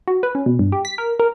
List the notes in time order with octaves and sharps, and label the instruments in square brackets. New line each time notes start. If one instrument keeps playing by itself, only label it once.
[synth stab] F#4
B4
C#4
B2
G2
G4
B6
A#4
A#4